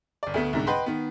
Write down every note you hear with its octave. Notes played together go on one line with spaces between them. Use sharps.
G1 D5
D2 A3 B3
C2 G#2 D3
B4 D#5 F#5 G5 B5 C6
D#3 B3